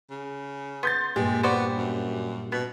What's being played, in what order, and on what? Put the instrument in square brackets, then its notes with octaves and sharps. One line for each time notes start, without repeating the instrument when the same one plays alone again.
[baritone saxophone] C#3
[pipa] B3 [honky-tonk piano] C6 G6 A6
[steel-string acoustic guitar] G2 A#2 [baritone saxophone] G#3 [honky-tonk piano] G4
[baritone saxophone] B3 [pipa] F#4 C5 D5
[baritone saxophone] F#2
[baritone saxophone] B2 [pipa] B3